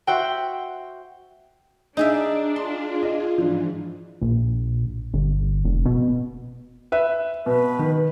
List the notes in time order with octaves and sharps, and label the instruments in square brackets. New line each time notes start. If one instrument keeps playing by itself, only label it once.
[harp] F#4 C5 E5 F#5 G5
[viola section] D4 [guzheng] D#4 G#4 E5
[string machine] F4 G#4 [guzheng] C6
[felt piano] D#5
[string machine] G#2 E3 [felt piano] F3 D4
[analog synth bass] A#1
G1
F1
B2
[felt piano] B4 E5
[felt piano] B2 [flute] B4
[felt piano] D#3